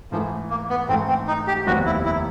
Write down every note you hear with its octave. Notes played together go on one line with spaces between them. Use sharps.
G#2 E3 F3 A3
A#3
B3
G#2 E3 A3 C4
C4
D#4
G4
F1 D#2 D#3 G3 B3 F#4
E4
E4